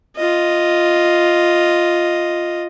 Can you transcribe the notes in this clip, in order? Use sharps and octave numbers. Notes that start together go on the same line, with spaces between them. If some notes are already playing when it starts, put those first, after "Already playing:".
F4 D#5